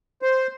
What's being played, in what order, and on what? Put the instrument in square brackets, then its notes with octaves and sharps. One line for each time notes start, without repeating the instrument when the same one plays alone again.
[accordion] C5